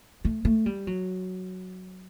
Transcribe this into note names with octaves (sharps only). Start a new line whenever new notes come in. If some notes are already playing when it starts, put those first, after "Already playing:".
A3
A3
G3
F#3